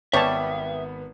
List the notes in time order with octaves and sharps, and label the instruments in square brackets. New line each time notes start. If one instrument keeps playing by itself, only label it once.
[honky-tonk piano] G#1 B3 [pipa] G3 [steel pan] C#5 A5 [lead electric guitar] E5